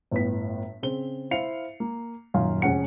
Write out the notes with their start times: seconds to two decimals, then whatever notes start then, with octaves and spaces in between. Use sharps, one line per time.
0.11 G1 A2 B3 B6
0.83 C#3 C4 C5 G7
1.31 E4 C5 F5 C7 C#7 F7
1.80 A#3
2.34 D#1 F#2 D#3 F5 C6
2.62 F1 G#3 C#4 C#5 F#5 C#7